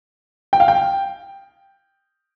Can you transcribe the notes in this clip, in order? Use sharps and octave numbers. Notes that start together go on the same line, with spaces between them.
G5
F5
G5